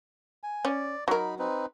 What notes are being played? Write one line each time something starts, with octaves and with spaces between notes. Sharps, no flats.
G#5
C#4 D5
F#3 D#4 A#4 B5
C4 D#4 B4